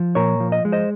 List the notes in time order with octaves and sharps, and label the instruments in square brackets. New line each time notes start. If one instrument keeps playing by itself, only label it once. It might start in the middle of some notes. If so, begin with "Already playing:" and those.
Already playing: [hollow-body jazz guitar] F3
A#2 A#4 C#5
F3
D#5
G#3
C5 D#5